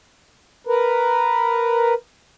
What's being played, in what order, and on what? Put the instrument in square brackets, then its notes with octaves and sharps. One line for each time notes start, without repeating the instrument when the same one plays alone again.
[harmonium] A#4 B4